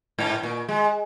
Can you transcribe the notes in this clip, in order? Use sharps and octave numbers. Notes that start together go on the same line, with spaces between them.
G#2
A#2
G#3